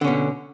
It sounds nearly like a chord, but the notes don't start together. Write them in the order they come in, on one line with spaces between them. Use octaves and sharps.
D3 C#4 B2